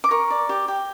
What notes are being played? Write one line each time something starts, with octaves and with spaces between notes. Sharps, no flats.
D6
A#4 C#6
D5
G4
G4